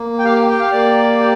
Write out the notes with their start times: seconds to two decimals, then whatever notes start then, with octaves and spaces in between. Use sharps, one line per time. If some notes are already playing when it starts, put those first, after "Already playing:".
Already playing: A#3
0.19 G5
0.25 G4 F5
0.49 G5
0.60 F5
0.72 A#3 D5
1.19 G4